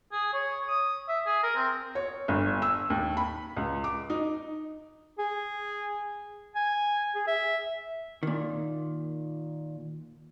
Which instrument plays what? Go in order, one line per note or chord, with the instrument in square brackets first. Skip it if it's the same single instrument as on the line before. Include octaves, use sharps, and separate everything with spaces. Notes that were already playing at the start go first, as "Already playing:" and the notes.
[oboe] G#4
C#5
D#6
E5
G#4
A#4
C4
[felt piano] C#5
G1
E6
D#2
B5
C#2
D6
D#4
[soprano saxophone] G#4
G#5
G#4
E5
[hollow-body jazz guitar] A#2 D#3